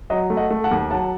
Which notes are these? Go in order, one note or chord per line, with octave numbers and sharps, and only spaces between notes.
F#3 D#5
A3
D#5 F#5
A3
F#5 A5
D#2
F#3 F#5 A5